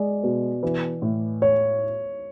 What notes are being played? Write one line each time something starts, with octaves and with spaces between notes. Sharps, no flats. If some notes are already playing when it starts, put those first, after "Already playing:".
Already playing: G#3 D5 D#5
B2
E3
A2
C#5